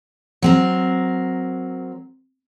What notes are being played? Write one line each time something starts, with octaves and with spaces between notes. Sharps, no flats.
F#3 C4 A#4